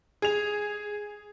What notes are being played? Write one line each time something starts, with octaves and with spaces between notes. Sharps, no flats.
G#4 F7